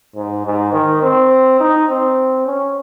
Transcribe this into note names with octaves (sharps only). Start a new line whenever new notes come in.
G#2
G#2
D#3
C4
D#4
C4
C#4